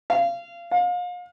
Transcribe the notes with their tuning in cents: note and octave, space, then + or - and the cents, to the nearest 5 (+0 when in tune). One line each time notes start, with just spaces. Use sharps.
F5 -25
F5 +35